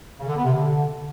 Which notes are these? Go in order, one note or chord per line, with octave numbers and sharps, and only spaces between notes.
C#3
D3
B3
C3
D3